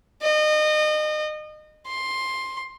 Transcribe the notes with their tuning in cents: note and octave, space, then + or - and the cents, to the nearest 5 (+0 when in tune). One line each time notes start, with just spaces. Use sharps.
D#5 -30
C6 +10